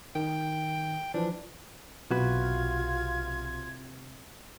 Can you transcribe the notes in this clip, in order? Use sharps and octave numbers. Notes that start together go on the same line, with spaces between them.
D#3 G5
E3 F3 D4
B1 C3 F4 F#4 B4 G#6